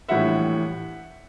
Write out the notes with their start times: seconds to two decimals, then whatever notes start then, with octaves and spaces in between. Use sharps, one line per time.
0.08 A#1 A2 E3 G3 E5 F#5